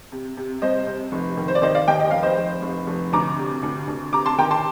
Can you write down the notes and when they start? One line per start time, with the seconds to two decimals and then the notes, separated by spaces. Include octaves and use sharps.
0.12 C3
0.37 C3
0.62 C2 C5 D#5
0.87 C3
1.12 F1
1.37 D#3
1.48 C5
1.55 D5
1.62 D#3 C5 D#5
1.74 D5 F5
1.88 D#2 D#5 G5
2.00 D#5
2.11 F1 F5
2.23 C5 D#5
2.38 F1
2.62 F1
2.87 F1
3.13 D2 A#5 D6
3.38 C3
3.63 D2
3.88 D2
4.13 C3 A#5 D6
4.26 A5 C6
4.38 D#3 G5 A#5
4.51 A5 C6